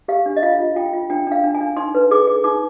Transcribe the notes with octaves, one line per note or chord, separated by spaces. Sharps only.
G4 F5
D4
D#5
F4 F5
F4
F4 G5
F4
D4 G5
D4 F5
D4
G#5
D4
D#4 C6
B4
G#4 D6
G#4
D#4 D6